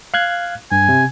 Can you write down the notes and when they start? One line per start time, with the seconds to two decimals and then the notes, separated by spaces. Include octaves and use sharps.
0.14 F5 F#6 G#6
0.72 G2 G#5
0.89 C3